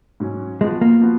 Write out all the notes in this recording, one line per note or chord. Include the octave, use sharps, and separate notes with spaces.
G#2 F#3 C#4
F3 G#3 B3 F#4
A#3
F3 B3 F#4